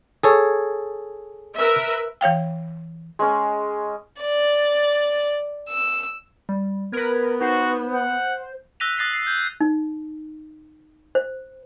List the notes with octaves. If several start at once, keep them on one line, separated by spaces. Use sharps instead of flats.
G#4 A4 C#5
A#4 B4 E5
E3 C#5 F5 G5
G#3 C#4
D5
E6
G3
B3 A#4 B4 G#6
D#4 F#4 C5
F#5 G6
E6 F#6 A#6 B6 D#7 F7
D#6 F#6 A6 A#6 C7
C7
G6
D#4
C5